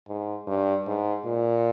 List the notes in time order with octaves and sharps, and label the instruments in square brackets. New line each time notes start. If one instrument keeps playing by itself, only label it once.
[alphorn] G#2
G2
G#2
A#2